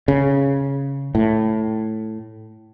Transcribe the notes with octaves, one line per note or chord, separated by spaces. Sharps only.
C#3
A2